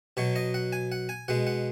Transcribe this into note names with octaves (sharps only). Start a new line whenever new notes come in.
B2 F#3 C#5
D#5
F#5
G#5
F#5
G#5
B2 G#3 F#5
F#5